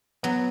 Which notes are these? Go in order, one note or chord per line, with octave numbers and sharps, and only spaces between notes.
F#3 B3